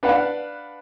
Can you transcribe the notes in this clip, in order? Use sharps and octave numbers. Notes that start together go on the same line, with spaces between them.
D4 B4 F5 F#5